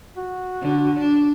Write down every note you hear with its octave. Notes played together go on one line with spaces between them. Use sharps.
F#4
D3
D4